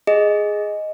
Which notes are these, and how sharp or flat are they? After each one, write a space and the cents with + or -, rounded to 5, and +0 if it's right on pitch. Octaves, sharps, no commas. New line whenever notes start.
G#4 +0 D#5 +0